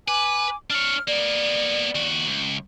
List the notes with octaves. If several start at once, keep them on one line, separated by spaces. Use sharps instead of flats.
B4 G#5 D6
D4 C#5 F6
A#3 B3 D5
D#2 F#4
C#2